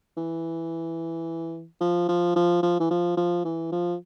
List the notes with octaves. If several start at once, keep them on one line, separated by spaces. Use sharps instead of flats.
E3
F3
F3
F3
F3
E3
F3
F3
E3
F3